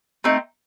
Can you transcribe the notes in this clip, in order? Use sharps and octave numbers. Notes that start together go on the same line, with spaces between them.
A3 C4 D#4